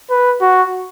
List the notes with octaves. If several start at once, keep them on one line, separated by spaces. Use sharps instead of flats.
B4
F#4